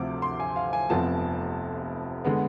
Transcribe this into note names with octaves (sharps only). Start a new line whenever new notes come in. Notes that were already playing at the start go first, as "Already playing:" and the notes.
Already playing: D2 C3 F3 A3 C4 D6
C6
G#5
F5
G#5
F1 F2 C3 F3 B3 A5
D3 G#3 B3